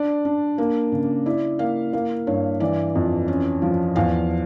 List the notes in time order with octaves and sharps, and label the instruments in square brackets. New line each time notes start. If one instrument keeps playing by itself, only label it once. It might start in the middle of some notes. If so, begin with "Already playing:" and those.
Already playing: [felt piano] D4 D5
D4
A#3
C#3
E4 D5
A#3 F5
A#3 F5
G2 C#5
E3 D5
F2
C#4
F3
E2 F5